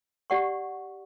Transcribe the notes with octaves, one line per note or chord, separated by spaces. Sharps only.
G4 D5 F#5 C#6